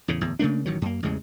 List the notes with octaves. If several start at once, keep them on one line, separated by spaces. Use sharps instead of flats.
E2 A2 C#3
D1 E2
C#3 A3 A#3 D4
A1 D#3 F#3
F#2 A#3
A1 E2 C#3 G#3